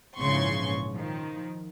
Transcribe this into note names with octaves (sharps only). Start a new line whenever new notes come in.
A#1 G#2 C#3 E3 C6 C#6
D#3 F3